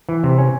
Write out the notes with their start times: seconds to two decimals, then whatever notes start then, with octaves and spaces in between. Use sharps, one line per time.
0.09 E3
0.23 C3
0.38 C#4